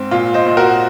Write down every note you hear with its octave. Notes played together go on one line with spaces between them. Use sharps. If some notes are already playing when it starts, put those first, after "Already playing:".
Already playing: G#2 C4
A#2 F4
C5 D#5
A#2
F#4 A#4